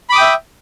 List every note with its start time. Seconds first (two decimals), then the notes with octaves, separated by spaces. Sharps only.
0.10 B5
0.12 D6
0.15 D#6
0.18 G5
0.21 E5